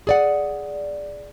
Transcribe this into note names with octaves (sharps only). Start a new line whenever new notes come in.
G#4 D5 F#5